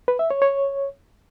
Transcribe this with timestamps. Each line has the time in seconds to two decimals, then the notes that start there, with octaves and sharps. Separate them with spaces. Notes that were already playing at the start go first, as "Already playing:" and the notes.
0.08 B4
0.19 E5
0.31 C#5
0.42 C#5